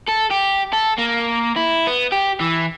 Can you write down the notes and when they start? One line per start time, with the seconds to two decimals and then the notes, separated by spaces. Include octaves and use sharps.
0.08 A4
0.30 G4
0.73 A4
0.98 A#3
1.56 E4
1.87 B3
2.12 G4
2.41 E3